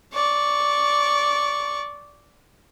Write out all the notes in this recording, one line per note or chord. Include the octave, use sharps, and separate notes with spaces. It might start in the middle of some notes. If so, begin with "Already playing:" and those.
D5 C#6